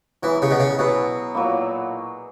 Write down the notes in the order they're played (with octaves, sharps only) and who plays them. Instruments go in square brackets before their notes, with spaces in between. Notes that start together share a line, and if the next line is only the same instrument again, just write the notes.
[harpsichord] E3 [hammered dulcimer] F#3 B3 E4 G#4
[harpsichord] C#3
B2
C#3
[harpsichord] B2 [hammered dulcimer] F#3 B3 E4 G#4
[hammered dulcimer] A#2 F#3 A#3 E4